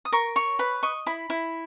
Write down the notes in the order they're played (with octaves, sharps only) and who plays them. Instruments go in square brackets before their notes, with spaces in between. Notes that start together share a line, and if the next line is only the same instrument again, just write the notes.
[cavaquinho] D#6
A#4 C#6
C#5 C#6
B4 B5
D#5 C#6
E4 B5
E4